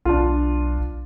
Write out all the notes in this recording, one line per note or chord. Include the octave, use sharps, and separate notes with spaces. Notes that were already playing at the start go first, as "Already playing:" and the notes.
B1 D4 F4